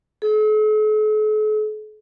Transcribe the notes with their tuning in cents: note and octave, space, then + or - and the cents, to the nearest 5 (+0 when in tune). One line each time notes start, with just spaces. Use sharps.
A4 -45